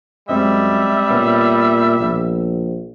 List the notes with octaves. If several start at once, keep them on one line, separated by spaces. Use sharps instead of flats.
F#2 G3 G#3 C4 D#5 E5
A#2 B3 C#4
A#1